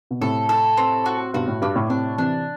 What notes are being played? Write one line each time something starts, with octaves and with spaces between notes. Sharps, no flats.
B2
A2 C3 A4
A4
C4
F#4
G2 B2 F#4
A2
G2 D4
A2
A2 C3 D4
C3 E3 D4